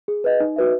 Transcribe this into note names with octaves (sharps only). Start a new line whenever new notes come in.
G#4
B4 D#5
D#4
F#4 B4 E5